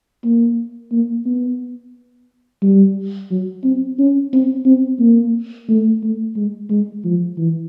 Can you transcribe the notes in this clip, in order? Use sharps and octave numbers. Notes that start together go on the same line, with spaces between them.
A#3
A#3
B3
G3
F#3
C4
C#4
C4
C4
A#3
A3
A3
G#3
G#3
F3
E3